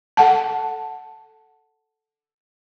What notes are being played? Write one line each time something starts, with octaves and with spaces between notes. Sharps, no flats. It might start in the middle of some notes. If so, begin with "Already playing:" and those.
A4 F#5 A5